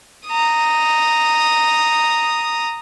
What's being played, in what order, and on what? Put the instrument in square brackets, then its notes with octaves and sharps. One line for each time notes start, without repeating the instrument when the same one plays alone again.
[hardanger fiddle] A#5 D#6